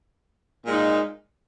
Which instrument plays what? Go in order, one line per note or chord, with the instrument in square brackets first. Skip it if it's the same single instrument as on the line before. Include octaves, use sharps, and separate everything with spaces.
[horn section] A#2 G#3 D#4